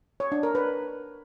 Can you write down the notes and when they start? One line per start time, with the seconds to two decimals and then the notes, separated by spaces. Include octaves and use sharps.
0.20 C#5
0.32 D4
0.43 A#4
0.55 B4